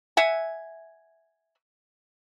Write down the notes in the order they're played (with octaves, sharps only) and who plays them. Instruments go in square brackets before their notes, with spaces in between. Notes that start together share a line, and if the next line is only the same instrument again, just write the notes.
[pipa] E5 F#5 G#5